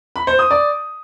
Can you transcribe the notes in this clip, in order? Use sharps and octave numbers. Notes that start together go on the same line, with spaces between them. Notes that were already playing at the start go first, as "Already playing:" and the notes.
B5
C5
D#6
D5